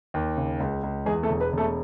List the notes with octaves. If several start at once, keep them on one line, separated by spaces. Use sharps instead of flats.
D#2
C#3
C#2
C#2
E2 G#3 G#4
A3 A4
E1
B3 B4
E1
A3 A4